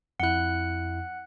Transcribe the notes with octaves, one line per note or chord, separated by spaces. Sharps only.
F2 E4 F#5 F#6